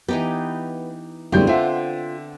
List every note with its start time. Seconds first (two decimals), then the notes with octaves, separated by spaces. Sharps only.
0.08 E3 B3 D#4 G4
1.32 A1 G#2 D3 G3 B3 C4 G6
1.47 D3 F4 C5 E5 F#5